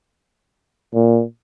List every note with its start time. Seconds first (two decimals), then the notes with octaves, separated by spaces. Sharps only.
0.94 A#2